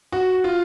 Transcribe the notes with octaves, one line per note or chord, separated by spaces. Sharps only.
F#4
F4